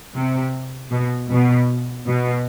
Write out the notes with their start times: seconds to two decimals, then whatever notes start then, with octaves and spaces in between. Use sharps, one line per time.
0.15 C3
0.92 B2
1.30 B2
2.07 B2